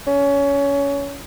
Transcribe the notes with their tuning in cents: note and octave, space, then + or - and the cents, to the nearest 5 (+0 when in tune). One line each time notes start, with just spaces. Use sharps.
C#4 +20